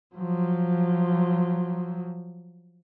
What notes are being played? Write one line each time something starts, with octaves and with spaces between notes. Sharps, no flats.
F3 F#3